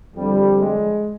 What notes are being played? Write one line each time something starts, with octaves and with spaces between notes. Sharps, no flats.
F2 D3 F3 G3
G#3